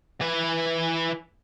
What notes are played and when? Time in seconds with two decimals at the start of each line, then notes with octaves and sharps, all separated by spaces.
0.21 E3 B4